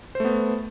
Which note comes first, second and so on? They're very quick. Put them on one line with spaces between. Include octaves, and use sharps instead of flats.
C5 A3 B3